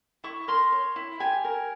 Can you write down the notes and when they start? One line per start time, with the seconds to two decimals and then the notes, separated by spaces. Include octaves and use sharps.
0.24 E4 C#6
0.48 A#4 C6
0.72 C#5
0.96 E4
1.20 G4 G#5
1.44 A#4